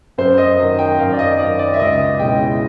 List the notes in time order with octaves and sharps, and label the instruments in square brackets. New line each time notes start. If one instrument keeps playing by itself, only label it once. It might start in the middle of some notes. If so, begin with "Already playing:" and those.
[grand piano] F#2 C5
D#5
D#3 F#3
G5
F#2 F5
D5
D#5
D#3 F#3 D5
D5
E5
C#2 D#5
B2 G#3 C#4 E4 G5